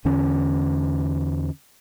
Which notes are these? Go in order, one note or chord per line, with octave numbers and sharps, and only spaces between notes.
E2 D3 C#4